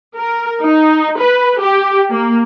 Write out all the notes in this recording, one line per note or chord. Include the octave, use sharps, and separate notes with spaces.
A#4
D#4
B4
G4
A#3